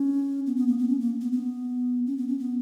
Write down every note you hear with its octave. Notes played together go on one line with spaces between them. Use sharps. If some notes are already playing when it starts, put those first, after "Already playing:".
Already playing: C#4
B3
B3
A#3
B3
C#4
A#3
B3
B3
C#4
B3
C#4
B3